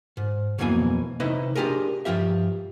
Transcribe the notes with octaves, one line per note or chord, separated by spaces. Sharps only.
G#2
B1 F2 B2 E3 A#3 G#5
C3 D#4 E4 B4 D#5 E5
D4 F4 G4 G#4 A#4
G2 F3 F4 G4 E5